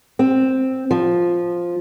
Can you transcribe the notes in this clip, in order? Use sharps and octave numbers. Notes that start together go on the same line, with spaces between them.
C4
F3